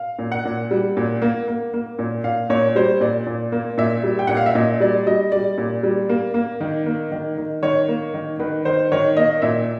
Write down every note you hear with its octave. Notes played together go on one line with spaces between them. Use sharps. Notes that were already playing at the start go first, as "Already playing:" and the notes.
Already playing: F5
A#2
F#5
A#2
G3
A#2
A#3
A#3
A#3
A#2
A#2 F5
A#2 C#5
G3 C5
A#2 D5
A#2
A#3
A#2 E5
G3
G5
A#2 F#5
F5
E5
A#2 D#5
G3 D5
G3 D#5
G3 D5
A#2
G3
A#3
A#3
D#3
A#3
D#3
D#3
D#3 C#5
A#3
D#3
D#3 B4
D#3 C5
D#3 C#5
A#3 D#5
A#2 E5